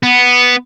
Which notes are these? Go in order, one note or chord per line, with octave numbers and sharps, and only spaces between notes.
B3